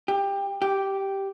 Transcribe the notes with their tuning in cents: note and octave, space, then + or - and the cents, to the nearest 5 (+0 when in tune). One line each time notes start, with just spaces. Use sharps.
G4 +20
G4 -5